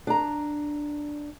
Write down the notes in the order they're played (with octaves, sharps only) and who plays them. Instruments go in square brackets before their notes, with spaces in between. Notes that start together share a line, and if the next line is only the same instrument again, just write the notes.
[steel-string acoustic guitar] D4 A#5